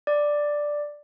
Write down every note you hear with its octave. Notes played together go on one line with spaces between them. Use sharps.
D5